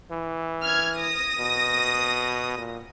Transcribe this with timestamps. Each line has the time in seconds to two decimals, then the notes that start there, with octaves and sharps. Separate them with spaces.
0.11 E3
0.64 F6 G#6
1.01 D#6 A#6
1.39 B2
2.58 A#2